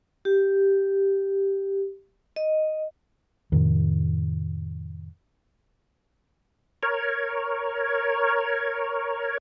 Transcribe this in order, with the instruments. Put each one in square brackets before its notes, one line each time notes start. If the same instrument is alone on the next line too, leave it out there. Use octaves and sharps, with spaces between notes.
[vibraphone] G4
D#5
[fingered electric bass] F2 A2 C3 D#3
[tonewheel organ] A#4 C#5